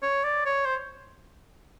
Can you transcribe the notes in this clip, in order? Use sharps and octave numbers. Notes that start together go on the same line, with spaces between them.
C#5
D5
C#5
C5